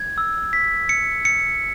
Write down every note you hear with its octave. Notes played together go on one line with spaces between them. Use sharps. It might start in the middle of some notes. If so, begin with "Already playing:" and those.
Already playing: G#6
E6
B6
C#7
C#7